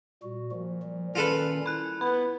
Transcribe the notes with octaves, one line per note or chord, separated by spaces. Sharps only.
A#2 G3 F#4
A#2 F3
F3 G3
D#3 G3 C#4 F4 A4 B4
E4 B5 F#6
B3 B5